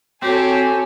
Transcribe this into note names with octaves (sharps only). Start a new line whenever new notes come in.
C4 F#4 G4 A4 C#5 G#5